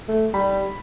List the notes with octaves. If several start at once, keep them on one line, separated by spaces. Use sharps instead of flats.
A3
G3 B5